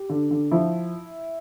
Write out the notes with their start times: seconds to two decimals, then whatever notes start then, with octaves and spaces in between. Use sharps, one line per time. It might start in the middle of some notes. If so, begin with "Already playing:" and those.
Already playing: G4
0.10 D3
0.31 D3
0.51 F3 E4